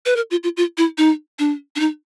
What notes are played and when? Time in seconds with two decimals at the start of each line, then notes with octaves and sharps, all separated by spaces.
0.06 B4
0.16 A#4
0.31 F4
0.43 F4
0.57 F4
0.77 E4
0.98 D#4
1.39 D4
1.76 D4
1.80 D#4